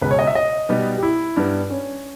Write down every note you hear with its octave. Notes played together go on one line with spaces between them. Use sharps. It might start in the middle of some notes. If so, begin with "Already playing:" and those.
C#2 B2 G#3 B4
C#5
D#5
E5
D#5
B2 G3 B3 D#4 G4
G4
E4
G2 G3 B3
C#4